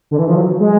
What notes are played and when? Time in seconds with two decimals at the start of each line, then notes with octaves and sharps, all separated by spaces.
0.11 D3
0.19 E3
0.28 F3
0.35 F#3
0.60 G#3